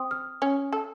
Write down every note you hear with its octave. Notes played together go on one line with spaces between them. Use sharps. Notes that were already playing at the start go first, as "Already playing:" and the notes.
Already playing: C4 D#6
F6
C#4
A4